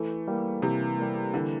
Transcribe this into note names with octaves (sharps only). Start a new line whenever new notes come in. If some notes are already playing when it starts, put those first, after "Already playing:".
Already playing: E3 A3
G3 A#3
C3 E3
G3 A#3
D3 E3